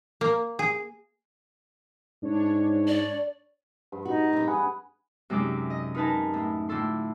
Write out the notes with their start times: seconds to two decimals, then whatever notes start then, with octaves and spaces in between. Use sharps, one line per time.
0.21 A#3
0.59 G#4
2.23 G#2 D4 C#5
2.88 D5
3.92 G2
4.05 D#4 F#4
4.33 G3 C4
4.47 G#4 B4 F#5
5.30 F#2 C3 G#3 D#4 C5 D5
5.70 D#5
5.95 D#4 A#4 B4 G#5 A5
6.34 A2
6.69 A2 D3 F4 A4 C6